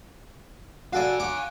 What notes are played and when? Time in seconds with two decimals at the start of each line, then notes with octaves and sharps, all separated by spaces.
0.93 F#4 A4 D5 F5 G#5
1.20 F#5 D6